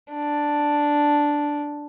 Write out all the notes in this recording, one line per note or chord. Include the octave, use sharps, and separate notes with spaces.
D4